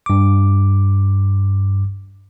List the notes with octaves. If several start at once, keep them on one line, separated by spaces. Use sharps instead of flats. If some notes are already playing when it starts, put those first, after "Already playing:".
G2 D6